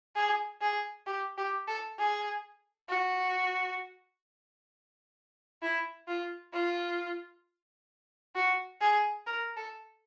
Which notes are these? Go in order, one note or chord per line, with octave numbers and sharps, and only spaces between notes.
G#4
G#4
G4
G4
A4
G#4
F#4
E4
F4
F4
F#4
G#4
A#4
A4